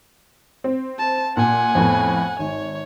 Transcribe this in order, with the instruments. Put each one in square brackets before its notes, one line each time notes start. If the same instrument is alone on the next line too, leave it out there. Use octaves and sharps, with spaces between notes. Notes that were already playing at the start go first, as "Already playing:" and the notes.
[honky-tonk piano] C4
[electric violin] A5
[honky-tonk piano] A#2 [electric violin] F#5 G#5
[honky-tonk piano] F2 A2 B3
[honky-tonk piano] G#1 [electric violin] C#5